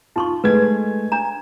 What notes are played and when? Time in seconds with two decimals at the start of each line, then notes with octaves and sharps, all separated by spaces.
0.16 D#4 F4 C6 C#6
0.44 G#3 A3 B4 G#6
1.12 D4 A#5